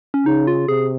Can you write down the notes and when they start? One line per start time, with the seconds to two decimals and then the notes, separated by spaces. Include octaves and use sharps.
0.14 C#4
0.26 C#3 D#4
0.47 F4
0.68 C3 G#4